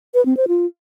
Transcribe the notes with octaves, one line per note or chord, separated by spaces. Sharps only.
B4
C4
C5
F4